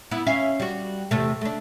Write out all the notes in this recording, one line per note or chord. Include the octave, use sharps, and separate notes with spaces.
B3 E4
C#4 E5 F5
G3 F#4
E2 C3 A3
A3 D4